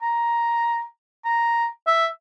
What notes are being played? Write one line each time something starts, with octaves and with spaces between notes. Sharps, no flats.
A#5
A#5
E5